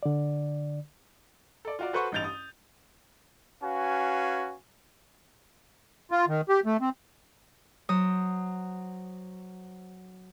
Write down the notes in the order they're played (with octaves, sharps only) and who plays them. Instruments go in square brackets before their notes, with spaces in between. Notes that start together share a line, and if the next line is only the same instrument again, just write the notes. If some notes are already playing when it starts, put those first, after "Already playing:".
[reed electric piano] D3 D5
[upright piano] A4 D5
F4 F#4 D5
F#4 A4 B4 C5 F#5 C#6
A1 G2 D#4 G6 A6 F7
D#6
[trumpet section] C#4 F#4 B4 F5 G#5
[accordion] F4
D#3
G4
A3
C4
[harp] F#3 C5 D#6